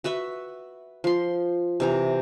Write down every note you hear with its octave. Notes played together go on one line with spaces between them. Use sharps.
F#4 B4 E5
F3 C6
C3 E3 A#5